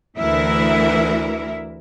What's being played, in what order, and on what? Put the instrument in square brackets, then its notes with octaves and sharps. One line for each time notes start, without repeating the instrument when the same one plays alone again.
[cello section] D2 E3 E4 A#4 E5